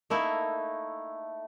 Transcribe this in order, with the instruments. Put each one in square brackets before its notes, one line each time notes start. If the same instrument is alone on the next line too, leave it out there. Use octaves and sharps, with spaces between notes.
[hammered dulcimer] A3 [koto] A#3 D#4 E4